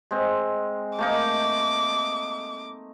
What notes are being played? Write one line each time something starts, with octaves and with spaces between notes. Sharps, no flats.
G#3 C4
A3 A#3 D#4 D6